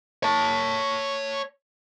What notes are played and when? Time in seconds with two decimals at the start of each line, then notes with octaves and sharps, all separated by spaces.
0.23 C#5 A5